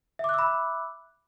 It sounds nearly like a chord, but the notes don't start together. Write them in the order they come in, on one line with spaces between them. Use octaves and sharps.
E5 D6 F#6 E6 B5